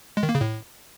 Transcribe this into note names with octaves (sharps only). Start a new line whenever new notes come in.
G#3
D#3
A#3
C#3
A2